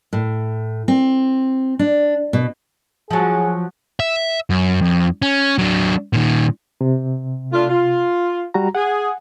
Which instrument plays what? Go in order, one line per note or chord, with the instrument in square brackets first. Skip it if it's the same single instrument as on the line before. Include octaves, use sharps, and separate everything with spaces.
[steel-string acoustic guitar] A2
C4
D4
B2
[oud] F3 F#3 [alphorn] G#4
[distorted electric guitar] E5
F#2
F2
C#4
F#3 D4
A#2 D#3
[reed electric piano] C3
[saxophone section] A3 D4 F4
F4
[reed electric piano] G3 F#4 A#5
[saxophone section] G#4 [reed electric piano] F#5